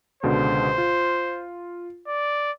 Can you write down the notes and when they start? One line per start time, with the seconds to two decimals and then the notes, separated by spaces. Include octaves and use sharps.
0.23 C#2 B2 D3 C5
0.78 F4
2.08 D5